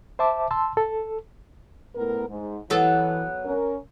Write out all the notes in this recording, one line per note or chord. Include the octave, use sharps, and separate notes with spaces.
C5 E5 A5 D6
A5 C6 E6
A4
A2 B3 A#4
G#2
E3 F#3 B3 A4
C#4 A#4